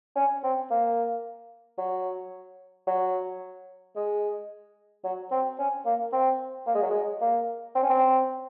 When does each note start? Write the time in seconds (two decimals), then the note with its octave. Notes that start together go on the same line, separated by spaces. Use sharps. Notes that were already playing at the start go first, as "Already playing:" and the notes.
0.16 C#4
0.43 C4
0.71 A#3
1.78 F#3
2.87 F#3
3.96 G#3
5.04 F#3
5.31 C4
5.59 C#4
5.86 A#3
6.12 C4
6.67 A#3
6.75 G#3
6.82 F#3
6.90 G#3
7.21 A#3
7.75 C4
7.83 C#4
7.90 C4